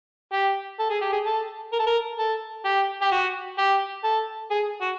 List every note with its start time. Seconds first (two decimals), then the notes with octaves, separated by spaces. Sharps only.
0.33 G4
0.79 A4
0.90 G#4
1.01 G4
1.13 G#4
1.26 A4
1.73 A#4
1.79 A4
1.87 A#4
2.19 A4
2.65 G4
3.02 G4
3.12 F#4
3.58 G4
4.04 A4
4.51 G#4
4.81 F#4